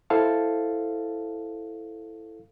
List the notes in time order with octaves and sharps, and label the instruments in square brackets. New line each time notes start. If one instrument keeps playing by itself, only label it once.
[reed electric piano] E4 A4 C5 F5 A5